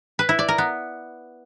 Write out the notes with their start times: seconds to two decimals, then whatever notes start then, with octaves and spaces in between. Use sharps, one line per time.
0.19 B4
0.29 E4
0.39 D5
0.48 A#4
0.58 B3